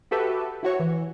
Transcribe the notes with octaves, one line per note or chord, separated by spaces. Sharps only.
F#4 G4 A4 B4 E5
E4 F#4 C#5
E3